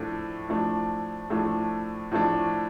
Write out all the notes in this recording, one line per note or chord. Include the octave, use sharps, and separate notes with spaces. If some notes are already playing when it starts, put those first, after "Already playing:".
Already playing: A2 F3 A3 D4
A2 F3 A3 D4
A2 F3 A3 D4
A2 F3 A3 D4